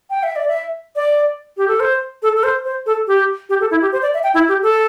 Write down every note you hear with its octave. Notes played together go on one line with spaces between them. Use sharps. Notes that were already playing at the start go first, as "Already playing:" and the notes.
G5
E5
D5
E5
D5
G4
A4
C5
A4
A4
C5
C5
A4
G4
G4
A4
E4
G4
C5
D5
E5
G5
E4
G4
A4